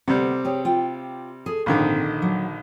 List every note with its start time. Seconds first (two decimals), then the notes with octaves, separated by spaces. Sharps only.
0.08 D2 C3 G3 B3 F#5
0.45 G4 G#4 C#5
0.65 F4 G5
1.46 G#4 A4
1.66 A#1 G#2 D3 D#3 C4 D#5
2.22 F#3